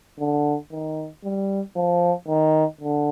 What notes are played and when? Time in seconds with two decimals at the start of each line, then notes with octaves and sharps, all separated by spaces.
0.19 D3
0.72 D#3
1.24 G3
1.76 F3
2.28 D#3
2.81 D3